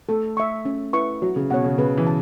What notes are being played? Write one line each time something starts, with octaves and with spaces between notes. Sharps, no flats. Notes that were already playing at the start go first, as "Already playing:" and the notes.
A3 A4
E5 C#6
C#4
E4 B4 E5 C#6
F#3 F#4
C#3
B2 C#5 F#5
C#3
C#3 B4
E3
A5